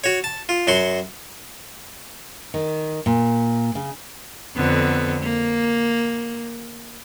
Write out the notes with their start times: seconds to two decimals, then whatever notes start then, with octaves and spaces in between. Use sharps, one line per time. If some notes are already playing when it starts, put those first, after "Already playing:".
0.04 F#4 C#5
0.24 A5
0.49 F4
0.67 F#2 F#3 F#4 C6
2.54 D#3
3.06 A#2
3.75 C#3
4.56 F2 D3 B3
5.23 A#3